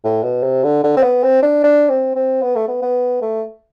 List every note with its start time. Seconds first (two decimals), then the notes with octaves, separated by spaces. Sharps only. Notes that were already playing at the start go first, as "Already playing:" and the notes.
0.04 A2
0.23 B2
0.43 C3
0.64 D3
0.84 D3
0.97 C4
1.03 B3
1.23 C4
1.43 D4
1.64 D4
1.90 C4
2.16 C4
2.42 B3
2.56 A3
2.68 B3
2.82 B3
3.22 A3